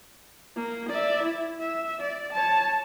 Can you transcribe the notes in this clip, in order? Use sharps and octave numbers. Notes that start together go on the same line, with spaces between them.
A#3
D5 E5
E4
E5
D5
C#5 A5